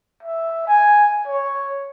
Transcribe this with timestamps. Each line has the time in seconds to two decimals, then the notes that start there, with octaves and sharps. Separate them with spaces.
0.23 E5
0.67 G#5
1.27 C#5